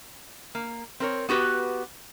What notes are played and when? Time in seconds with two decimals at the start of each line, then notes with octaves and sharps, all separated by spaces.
0.55 A#3
1.00 C4 A#4 C#5
1.29 B3 F#4 G4 B4